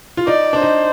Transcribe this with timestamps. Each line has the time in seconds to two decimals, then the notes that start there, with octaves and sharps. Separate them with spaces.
0.17 F4
0.27 D#4 D5
0.53 D4
0.62 D#4 C5